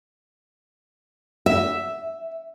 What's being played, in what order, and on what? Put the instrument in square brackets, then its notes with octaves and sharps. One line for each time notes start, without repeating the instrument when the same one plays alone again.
[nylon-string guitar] E5